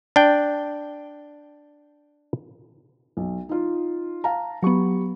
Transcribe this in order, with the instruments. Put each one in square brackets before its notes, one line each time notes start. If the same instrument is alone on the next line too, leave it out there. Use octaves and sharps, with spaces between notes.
[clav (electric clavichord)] D4 G5
[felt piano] B1
D#4 F4
F5 A5 A#5
[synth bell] F#3 B3 [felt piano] G4 C#6